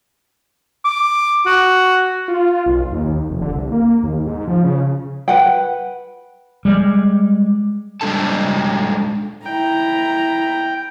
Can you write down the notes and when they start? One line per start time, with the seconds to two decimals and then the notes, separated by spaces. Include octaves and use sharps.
0.84 D6
1.46 F#4
2.28 F4
2.66 B1
2.92 D#2
3.30 F1
3.42 D3
3.54 C2
3.72 A#3
4.03 D#2
4.26 G#2
4.47 F3
4.64 C#3
5.28 B4 F#5 G5
6.65 G3 G#3
8.01 G3 G#3 D4 A4 A5
9.46 E4 G5 A#5